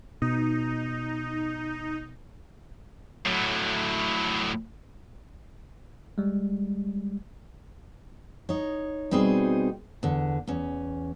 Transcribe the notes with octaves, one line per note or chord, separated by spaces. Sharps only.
B2 D#4
A2 F#3
G3 G#3
D#4 C#5
B2 G3 C4 D#4 F#4 G#4
E2 D3
E2 C#4